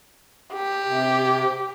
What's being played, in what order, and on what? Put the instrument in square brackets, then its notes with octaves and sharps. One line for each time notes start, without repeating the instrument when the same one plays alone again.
[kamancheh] G4
[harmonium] C3